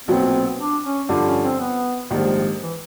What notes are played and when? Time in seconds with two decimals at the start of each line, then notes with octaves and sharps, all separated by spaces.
0.08 B1 A#2 F#3 B3 C4
0.59 D4
0.84 C#4
1.09 G2 D3 F3 D4
1.26 C#4
1.43 C4
1.59 B3
2.10 A#1 G#2 D#3 F3 G3
2.61 E3